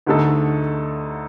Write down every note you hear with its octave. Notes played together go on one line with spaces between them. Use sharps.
D2 D3 A3 D#4 A4